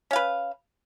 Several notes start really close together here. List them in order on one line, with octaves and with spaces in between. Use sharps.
C#4 F5 B4